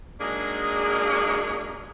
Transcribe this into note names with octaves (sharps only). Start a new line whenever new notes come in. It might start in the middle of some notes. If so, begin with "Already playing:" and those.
F#3 G#3 A#3 D4 D#4 G#4